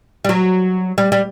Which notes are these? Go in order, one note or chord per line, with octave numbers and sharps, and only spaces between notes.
G3
F#3
G3
G3